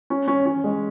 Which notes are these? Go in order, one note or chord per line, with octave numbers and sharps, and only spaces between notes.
C#4
C#4
C#4
G#3